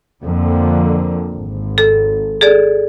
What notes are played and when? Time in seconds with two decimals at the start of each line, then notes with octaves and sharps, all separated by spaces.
0.23 F2 D3 A#3
1.31 G#1
1.78 A4
2.41 G#4 A4 D5